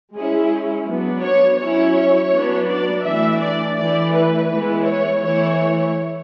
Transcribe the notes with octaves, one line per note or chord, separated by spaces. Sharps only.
G#3 C#4 E4 G#4
F#3 B3 D4
C#5
F#3 C#4 E4 C#5
F#3 B3 D4
D5
E3 A3 D4 E5
D5
E3 A3 E4 D5
B4
E3 G#3 B3 E4
C#5
E3 A3 E4 C#5